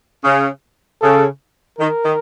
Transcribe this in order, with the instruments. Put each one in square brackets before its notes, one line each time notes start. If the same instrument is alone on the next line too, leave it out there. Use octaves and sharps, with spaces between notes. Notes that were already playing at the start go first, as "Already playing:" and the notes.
[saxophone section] C#3
[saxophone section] C#3 [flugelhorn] A4
[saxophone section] D#3 [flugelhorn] A#4
[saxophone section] D#3